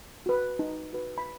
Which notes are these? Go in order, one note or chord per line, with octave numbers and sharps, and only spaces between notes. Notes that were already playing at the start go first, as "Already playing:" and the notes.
F#4 B4
D#4
F#4 B4
B5